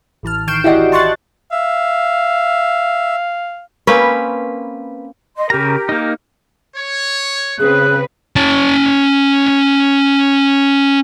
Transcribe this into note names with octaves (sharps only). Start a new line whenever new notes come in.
A1 E3 A5 F6
D#3 C#6 G6 C7 D7 E7
E4 F#4 G4 D5 D#5 F#5
A5 C6 C#6 F#6 A6
E5 F5
A#3 C4 C#4 B4
D#5 C6
C#3 G4 A#4 A#5
A#3 D#4
C#5
C#3 C4 G#4 B4 F#6
C#4 A5